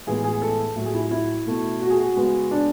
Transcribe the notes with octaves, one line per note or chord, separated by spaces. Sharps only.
A2 E3 G#3 B3 G#4
G#4
A4
A2 F#3 A3
G#4
E4
E4
B2 A3
F#4
G#4
F#4
C#3 G#3 B3
D4